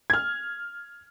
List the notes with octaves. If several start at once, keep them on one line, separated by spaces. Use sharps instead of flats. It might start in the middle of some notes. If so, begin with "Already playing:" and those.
F6 G#6